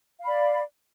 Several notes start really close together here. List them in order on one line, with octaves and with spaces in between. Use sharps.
F5 B5 D5